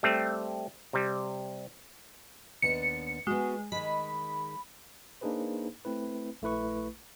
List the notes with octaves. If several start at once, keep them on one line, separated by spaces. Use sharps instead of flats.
G3 A3 C4
C3 G3
D#2 B3 D4 C#7
G#3 B3 F#4
D#3 G#3 B5
A#3 D4 D#4 G#4 B4 C5
A3 C4 E4 B4
A#1 A3 E4 B4 C#6